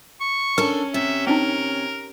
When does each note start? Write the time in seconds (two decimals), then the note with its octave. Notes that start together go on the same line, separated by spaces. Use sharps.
0.21 C#6
0.58 C#4 D4 A4 A#4
0.94 C3 E5
1.27 C4 D4 D#4 A#4